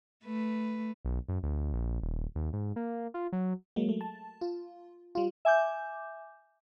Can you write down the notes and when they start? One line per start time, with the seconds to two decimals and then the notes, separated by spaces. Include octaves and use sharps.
0.25 A3 B4
1.05 B1
1.28 F#2
1.43 D2
1.73 A#1
2.02 D#1
2.35 D#2
2.53 G#2
2.76 A#3
3.14 F4
3.32 F#3
3.76 F#3 G#3 A#3
3.89 A3
4.01 A5
4.41 F4
5.15 G3 F4
5.45 E5 G#5 D6 G6